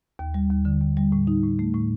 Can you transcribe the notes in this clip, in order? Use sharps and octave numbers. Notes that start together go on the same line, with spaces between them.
D#2
G3
D#2
D3
D#2
G3
A2
D#4
A2
A3
A2